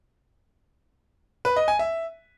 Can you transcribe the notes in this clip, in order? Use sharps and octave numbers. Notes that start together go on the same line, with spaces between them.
B4
D#5
G#5
E5